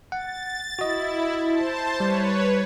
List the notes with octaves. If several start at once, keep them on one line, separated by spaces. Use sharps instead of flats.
F#5 A6
E4 F#4 D#5
C5 A5
G3 B4 C#5